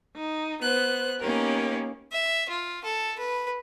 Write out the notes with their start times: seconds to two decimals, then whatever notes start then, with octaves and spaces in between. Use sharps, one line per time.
0.16 D#4
0.62 B3 C5 F#6
1.21 A#3 B3 C#4 D#4 G4 A#4
2.12 E5
2.49 F4
2.84 A4
3.19 B4